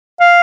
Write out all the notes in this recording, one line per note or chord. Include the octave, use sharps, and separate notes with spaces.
F5